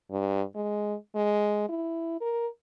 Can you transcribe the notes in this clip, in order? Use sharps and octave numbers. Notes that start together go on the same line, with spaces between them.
G2
G#3
G#3
E4
A#4